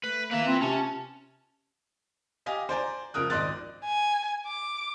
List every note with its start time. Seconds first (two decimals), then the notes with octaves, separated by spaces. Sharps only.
0.04 A3 B4
0.31 A#3 B4 E5
0.46 C4 F4
0.62 C3 C#4 A5
2.46 G4 D#5 F5 G#5
2.69 C5 D5 G#5 A#5
3.14 C#2 F3 A#4 D#6 F#6
3.30 G#1 D5 D#5 C6 F#6 A6
3.85 G#5
4.47 D6